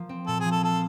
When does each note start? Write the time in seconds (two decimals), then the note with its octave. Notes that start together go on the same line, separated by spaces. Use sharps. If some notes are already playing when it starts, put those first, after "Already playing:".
Already playing: F3 A#3
0.09 C4
0.27 A#2 A4
0.40 G#4
0.45 F3
0.51 A4
0.63 F4 A4